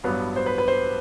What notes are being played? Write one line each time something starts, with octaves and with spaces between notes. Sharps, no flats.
A1 G2 F#3 B3
C5
B4
B4
C5